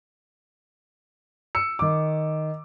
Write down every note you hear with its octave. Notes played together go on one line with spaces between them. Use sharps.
E6 C#7
D#3 D6